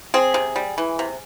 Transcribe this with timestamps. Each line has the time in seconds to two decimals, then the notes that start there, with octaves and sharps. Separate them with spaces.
0.14 C4 G#4
0.34 C3
0.56 G3
0.78 E3
0.99 C3